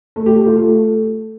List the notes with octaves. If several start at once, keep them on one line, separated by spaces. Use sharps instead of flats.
A3
G4
A3
F4
A3